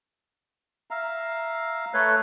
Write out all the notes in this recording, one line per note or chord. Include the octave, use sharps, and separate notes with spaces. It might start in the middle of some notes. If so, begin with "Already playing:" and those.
E5 F5 A#5
A3 A4 B4 C#5